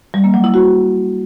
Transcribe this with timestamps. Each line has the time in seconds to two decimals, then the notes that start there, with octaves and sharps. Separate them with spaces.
0.14 G3
0.24 A#3
0.34 F#3
0.44 E4
0.54 F#4